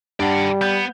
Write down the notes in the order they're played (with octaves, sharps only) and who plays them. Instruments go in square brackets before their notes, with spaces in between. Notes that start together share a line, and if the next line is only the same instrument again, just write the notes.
[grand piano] G2 [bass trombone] G3 [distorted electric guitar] D5 F#5
[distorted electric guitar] B3 [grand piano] G6